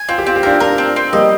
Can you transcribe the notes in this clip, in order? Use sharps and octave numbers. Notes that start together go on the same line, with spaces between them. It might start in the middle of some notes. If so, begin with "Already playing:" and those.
Already playing: G#5
C4 F4
G4
C4 F4
G4
D4 F4 A#4
D4 F4 A#4
C4
C4
G3 A#3 D#5